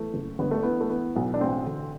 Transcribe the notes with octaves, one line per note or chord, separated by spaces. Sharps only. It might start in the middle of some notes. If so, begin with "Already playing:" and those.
Already playing: E2 A3
F#1
G1 B3
A3
E3 B3
A3
E3 B3
B1
D4
A1 C4
D3